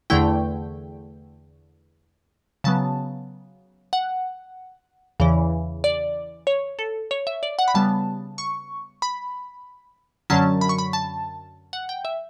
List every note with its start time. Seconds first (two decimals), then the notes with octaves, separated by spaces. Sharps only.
0.10 E2 D3 A3 E4 G5
2.64 C#3 F#3 B3 A5
3.93 F#5
5.20 E2 C#3 E3
5.84 D5
6.47 C#5
6.79 A4
7.11 C#5
7.27 E5
7.43 D5
7.59 F#5
7.68 B5
7.74 C#3 G3 B3 A5
8.38 C#6
9.02 B5
10.30 F#2 D3 F#3 C#4 A5
10.61 B5
10.69 C#6
10.78 B5
10.93 A5
11.73 F#5
11.89 G5
12.05 E5